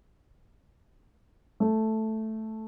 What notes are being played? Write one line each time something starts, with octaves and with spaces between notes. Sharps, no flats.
A3